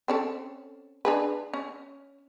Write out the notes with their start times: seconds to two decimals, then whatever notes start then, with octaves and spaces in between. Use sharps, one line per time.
0.08 C4 C#4 A4
1.05 D4 G#4 B4
1.54 C#4